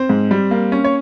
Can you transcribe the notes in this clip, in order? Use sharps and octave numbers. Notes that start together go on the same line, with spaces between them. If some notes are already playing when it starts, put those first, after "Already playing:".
Already playing: C4 C5
G#2
G3
A#3
C#4
C#5